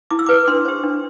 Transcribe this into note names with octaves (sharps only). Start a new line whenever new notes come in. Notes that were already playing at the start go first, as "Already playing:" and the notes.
E4 D6
E6
B4 D6
D4 C6
G4 C5
D4